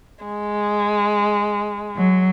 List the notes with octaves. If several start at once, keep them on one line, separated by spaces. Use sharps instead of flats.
G#3
F#3